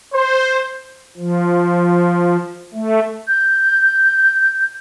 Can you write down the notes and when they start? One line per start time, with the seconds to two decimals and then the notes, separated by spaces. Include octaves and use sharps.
0.13 C5
1.17 F3
2.74 A3
3.28 G6